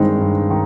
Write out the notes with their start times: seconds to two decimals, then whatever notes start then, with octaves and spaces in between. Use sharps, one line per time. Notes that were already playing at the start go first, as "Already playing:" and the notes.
Already playing: G2 D#3 G#3 C4 D#4
0.19 G2
0.50 D#3